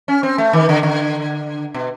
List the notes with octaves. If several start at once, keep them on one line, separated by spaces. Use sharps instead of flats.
C#4
C4
A3
D#3
D3
D3
B2